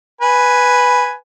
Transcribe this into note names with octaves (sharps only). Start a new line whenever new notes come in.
B4 G#5